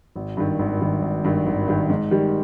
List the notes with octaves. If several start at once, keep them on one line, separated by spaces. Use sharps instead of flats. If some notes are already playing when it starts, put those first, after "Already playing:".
G#1
G2 D#3
G#1
G2 D#3
G#1
G2 D#3
G#1
G2 D#3
G#2
D#3 G3